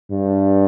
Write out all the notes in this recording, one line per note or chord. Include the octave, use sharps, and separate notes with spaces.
G2